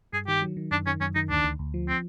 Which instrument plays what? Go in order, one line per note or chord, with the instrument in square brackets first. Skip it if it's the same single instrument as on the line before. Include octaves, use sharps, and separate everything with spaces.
[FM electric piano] G2 [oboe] G#4
[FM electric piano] D#3 [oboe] G4
[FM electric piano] F#3
D#3
[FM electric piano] F#2 [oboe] D4
[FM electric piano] D#3 [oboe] C#4
[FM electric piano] F#2 [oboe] C#4
[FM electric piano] D#3 [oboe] D#4
[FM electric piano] D2 [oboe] D4
[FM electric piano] D2
D2
F3
[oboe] C4